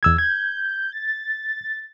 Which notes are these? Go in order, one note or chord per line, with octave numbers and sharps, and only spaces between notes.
E2 E6 G#6
G6 G#6
A6